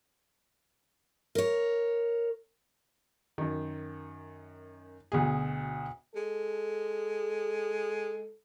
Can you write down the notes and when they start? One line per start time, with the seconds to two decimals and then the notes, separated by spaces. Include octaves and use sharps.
1.35 A#4 C#5
3.38 F#2 D#3
5.12 D2 B2 G#4
6.15 G#3 A4